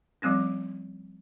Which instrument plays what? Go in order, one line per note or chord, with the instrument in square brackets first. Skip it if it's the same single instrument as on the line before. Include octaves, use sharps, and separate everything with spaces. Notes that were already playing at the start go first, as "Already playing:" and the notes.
[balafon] F3 G3 A3 C4 C#4